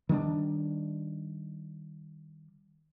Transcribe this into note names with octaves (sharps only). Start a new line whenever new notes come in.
D#3 G3 C#4 D4